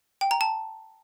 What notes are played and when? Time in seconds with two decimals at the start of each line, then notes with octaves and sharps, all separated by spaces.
0.21 G5
0.31 A#5
0.41 A5